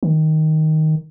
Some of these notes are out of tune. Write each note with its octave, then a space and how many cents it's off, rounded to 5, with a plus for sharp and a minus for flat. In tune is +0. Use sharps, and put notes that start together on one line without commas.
D#3 +5